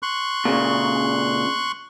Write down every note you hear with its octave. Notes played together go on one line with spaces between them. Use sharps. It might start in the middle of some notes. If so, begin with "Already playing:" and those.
C6 C#6 F#6
A#2 C#3